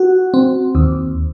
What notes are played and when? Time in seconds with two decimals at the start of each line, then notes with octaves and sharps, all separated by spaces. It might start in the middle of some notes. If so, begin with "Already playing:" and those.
Already playing: F#4
0.34 C4
0.75 D#2